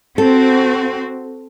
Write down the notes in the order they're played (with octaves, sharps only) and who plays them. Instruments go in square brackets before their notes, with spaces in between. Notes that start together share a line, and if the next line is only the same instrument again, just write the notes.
[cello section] C4 F#4 [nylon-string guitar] A4